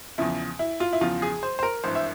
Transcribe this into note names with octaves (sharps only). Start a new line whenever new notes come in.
E2 C#3 F3 E4
E4
F4
E4
E2 C#3 F3 F4
G#4
C5
C5
A#4
G#1 G2 E3 C5
E5